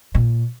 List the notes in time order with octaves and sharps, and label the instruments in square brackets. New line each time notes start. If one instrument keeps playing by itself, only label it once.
[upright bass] A#2